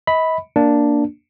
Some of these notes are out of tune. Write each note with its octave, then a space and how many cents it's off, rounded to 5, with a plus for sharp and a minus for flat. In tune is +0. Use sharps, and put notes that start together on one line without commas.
D#5 +40 B5 +0
A#3 +0 D4 +0